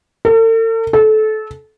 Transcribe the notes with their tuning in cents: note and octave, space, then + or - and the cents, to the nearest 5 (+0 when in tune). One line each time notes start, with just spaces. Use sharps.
A4 +45
A4 -25